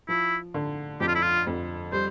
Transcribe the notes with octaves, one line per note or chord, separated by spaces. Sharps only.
F3 E4
D3
F2 G4
F4
E4
F4
F2
G3 C5